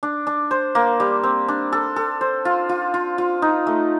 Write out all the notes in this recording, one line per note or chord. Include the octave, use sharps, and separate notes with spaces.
D4
D4
C5
A#3
G3
C4
D4
A4
A4
C5
F4
F4
F4
F4
D#4
A3